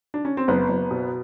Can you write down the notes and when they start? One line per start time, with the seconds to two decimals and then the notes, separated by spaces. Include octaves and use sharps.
0.14 D4
0.25 C#4
0.37 C4
0.48 F#1 B3
0.69 F#1
0.91 B2